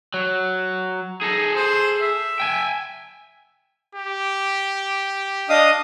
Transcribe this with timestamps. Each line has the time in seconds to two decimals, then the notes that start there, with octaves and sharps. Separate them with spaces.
0.14 F#3
1.21 D#4 G#4 A4
1.56 C5
2.01 E5
2.40 G5 G#5
3.95 G4
5.49 D4 D#5 F5 D#6